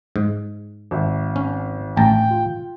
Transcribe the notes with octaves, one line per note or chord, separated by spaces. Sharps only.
G#2
G#1 E5
C#4
A1 G5 A5 A#5
F4